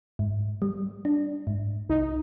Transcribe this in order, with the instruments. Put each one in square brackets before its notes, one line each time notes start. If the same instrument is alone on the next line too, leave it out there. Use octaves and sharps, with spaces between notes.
[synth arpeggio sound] G#2
G3
D4
G#2
[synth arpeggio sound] C2 [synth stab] D#4